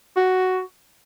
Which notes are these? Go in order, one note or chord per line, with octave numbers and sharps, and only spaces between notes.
F#4